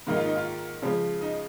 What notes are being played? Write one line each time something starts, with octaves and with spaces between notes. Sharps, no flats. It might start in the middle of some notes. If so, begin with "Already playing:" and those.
G#2 D#3 A#3 D#4
F4
D#4
F4
C#3 F3 G#3
D#4